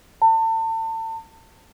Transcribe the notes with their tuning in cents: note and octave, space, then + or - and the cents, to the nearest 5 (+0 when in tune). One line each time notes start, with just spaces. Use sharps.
A5 +35